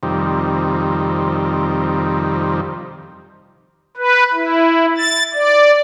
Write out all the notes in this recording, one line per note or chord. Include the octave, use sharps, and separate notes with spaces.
F2 C3 D#3 G3
B4
E4
A6
D5